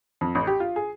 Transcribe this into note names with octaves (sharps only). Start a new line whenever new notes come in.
F2
A1
G4
F4
G#4